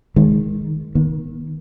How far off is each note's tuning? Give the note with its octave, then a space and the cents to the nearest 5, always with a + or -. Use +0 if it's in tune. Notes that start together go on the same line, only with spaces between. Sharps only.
D#3 +0 G#3 +0
D#3 +0 B3 -45